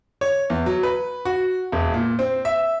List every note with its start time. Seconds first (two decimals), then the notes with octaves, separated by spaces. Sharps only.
0.21 C#5
0.50 E2
0.66 F#3
0.83 B4
1.25 F#4
1.72 E1
1.94 A#2
2.19 C4
2.45 E5